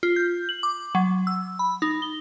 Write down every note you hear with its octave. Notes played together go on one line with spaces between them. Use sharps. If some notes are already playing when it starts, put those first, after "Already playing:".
F4
G6
F#7
D6
F#3
E6
B5
D#4
G7